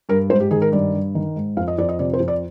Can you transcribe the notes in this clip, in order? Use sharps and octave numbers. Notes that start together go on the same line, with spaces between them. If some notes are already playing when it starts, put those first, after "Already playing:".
G2 A#4
G#2 C5
G4
D#3 G#4
A#4
G2 D5
G2
D#3
G#2
F2 F5
D#5
F2 D5
D#5
C3 D5
C5
F2
D5